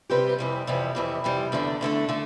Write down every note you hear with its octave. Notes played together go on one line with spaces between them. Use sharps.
C3 G3 C4 G4 B4
F2 C3 E3 G3
F2 C3 E3 G3
F2 C3 E3 G3
F2 C3 E3 G3
E2 D3 A3 D4
E2 D3 A3 D4
D3 A3